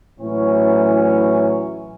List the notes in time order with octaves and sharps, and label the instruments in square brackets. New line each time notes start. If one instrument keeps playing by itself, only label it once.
[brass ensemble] A2 E3 F#3 C#4